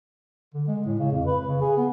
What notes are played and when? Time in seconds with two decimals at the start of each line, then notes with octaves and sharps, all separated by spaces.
0.54 D3
0.68 G#3
0.85 A2
0.99 C#3
1.12 F2
1.26 B4
1.47 C#3
1.61 G#4
1.77 B3